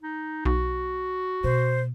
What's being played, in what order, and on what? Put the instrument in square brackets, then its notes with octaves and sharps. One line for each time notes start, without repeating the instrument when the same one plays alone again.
[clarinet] D#4
[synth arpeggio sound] B1 [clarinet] F#4
[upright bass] B2 [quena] C5